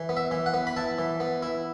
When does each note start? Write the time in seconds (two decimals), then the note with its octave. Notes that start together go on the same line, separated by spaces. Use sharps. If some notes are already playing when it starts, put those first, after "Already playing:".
Already playing: E3
0.09 B3
0.17 E5
0.31 E3
0.46 F#5
0.54 B3
0.67 B5
0.76 E4 A5
0.99 E3
1.20 B3
1.42 E4